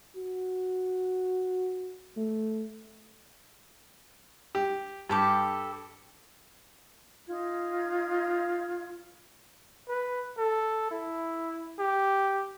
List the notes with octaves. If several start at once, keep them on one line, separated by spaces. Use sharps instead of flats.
F#4
A3
G4
G2 G4 A4 D6
D#4 F4 G#6
B4
A4
E4
G4